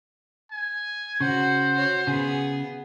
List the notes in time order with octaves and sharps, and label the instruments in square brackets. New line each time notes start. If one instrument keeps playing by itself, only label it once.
[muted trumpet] G#5
[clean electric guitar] C#3 [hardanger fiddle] F#4 F#5 [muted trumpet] C5
[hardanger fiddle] F#4 C#5
[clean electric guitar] C#3 [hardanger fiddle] B3 G#4